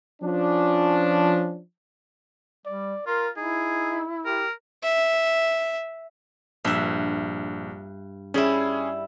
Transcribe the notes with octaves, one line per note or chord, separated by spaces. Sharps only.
F3 C#4 D4
G3 D5
F4 A#4 C6
D#4 E4 G#4
G4 A#4
E5
A#1 G2 E5
G3 C#4 E4 G#4